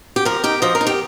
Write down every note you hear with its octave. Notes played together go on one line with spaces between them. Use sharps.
G4
F3 A#4
D#4 G4
F3 D#5
A#4
D#4
G4